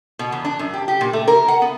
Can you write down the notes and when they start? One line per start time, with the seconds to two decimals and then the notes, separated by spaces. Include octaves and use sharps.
0.19 B2
0.32 E2
0.45 D4
0.59 F#2
0.74 G4
0.88 G4
1.01 A#2
1.13 A3
1.28 A#4
1.48 F#5
1.62 B3